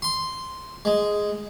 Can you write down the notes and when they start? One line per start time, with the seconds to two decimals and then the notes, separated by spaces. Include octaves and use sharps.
0.02 C6
0.85 G#3